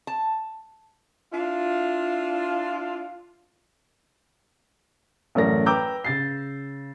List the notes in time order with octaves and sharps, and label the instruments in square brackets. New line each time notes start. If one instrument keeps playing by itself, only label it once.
[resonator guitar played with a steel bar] A5
[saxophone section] D4 E4 F4
[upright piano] A1 F#2 A3 A#4 D5 A#6
B4 G5 A#5 D6 E6 G6
C#3 A6 C7